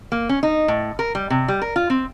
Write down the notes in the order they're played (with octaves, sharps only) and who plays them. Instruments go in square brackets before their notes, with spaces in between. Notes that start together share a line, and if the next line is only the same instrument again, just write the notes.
[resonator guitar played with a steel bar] A#3
C#4
D#4
A2
A#4
G3
C3
G3
A#4
F4
C4